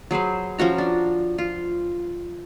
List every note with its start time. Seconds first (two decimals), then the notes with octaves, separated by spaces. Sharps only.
0.11 F#3 G#4 B4 C5
0.59 F3 C#4 F#4 A#5
0.78 D4
1.38 F4